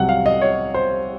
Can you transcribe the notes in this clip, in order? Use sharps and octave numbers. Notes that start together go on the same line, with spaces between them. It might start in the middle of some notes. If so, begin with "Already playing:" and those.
Already playing: C2 C3 F#3 F#5
F5
D#5
C#5
C5